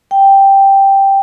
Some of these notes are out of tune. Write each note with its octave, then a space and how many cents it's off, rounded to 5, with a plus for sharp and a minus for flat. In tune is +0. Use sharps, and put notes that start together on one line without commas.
G5 +0